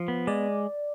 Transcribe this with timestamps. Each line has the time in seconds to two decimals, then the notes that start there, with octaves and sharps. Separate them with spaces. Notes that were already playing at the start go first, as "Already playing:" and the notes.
Already playing: F3
0.08 B3
0.27 G#3 D5